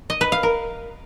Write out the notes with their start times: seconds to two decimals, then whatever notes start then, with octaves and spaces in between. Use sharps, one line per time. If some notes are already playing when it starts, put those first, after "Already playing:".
0.10 D#5
0.21 B4
0.32 F5
0.43 A#4